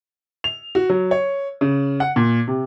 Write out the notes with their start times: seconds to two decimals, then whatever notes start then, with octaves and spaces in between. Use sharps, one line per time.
0.44 F7
0.75 F#4
0.90 F#3
1.11 C#5
1.61 C#3
2.00 F#5
2.16 A#2
2.48 C3